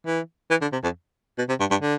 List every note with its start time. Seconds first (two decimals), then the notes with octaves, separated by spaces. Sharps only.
0.07 E3
0.50 E3
0.62 D3
0.72 C3
0.84 F2
1.38 B2
1.49 C3
1.60 G2
1.71 G2
1.82 D3